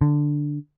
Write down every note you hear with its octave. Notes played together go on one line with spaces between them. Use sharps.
D3